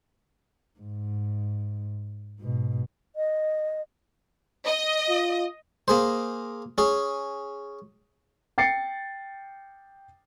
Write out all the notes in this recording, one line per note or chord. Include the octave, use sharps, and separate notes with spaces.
G#2
G#2 B2
D#5
D#5
F4
A#3 G#4 C5
C#4 G#4
G5 A6 C7 C#7